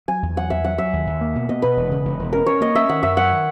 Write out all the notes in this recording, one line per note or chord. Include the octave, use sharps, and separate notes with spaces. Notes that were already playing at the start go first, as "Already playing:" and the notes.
F#3 G#5
E2
F#3 F#5
E2 E5
F#3 F#5
F#3 E5
D#2
D#2
A#3
B2
B2 D#5
B2 B4
E1
C#3
E1
E1
C#4 A#4
C#4 C#5
A#3 D#5
C#4 E5
D#3 F#5
F#2 E5
F#2 F#5
D#3